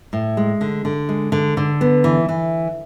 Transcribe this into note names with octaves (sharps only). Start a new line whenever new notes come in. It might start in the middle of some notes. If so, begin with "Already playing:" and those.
A2
G#3
D3
D3
G#3
D3
D3
B3
E3
E3